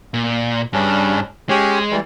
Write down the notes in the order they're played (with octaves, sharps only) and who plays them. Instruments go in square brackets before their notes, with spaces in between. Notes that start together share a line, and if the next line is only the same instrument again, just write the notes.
[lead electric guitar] A#2
[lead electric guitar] G2 [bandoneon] C#3 C#4 D4
[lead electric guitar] G#3 [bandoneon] C#4 G4 C#5
[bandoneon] E3 G3